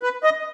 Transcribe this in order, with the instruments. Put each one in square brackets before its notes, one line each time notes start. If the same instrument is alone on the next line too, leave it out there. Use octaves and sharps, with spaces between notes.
[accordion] B4
D#5